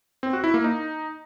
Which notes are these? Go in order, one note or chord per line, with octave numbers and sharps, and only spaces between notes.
C4
F#4
E4
A#3
D#4